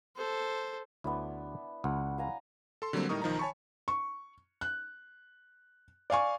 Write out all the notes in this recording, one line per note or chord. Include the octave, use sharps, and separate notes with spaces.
A4 C5
D2 B3 D4 E4
C#2 F#5
F5 G#5 A#5
A4 C6
D3 F#3 G3 A#3 C4
A2 G3 D#4 A#4 C#6 D#6
B1 D#3 F3 D#4 A#5
C#5 G#5 A5 B5 C#6
C#6
F#6
D5 F5 G#5 C#6